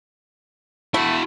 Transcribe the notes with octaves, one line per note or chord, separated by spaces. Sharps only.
A3 E4 F#4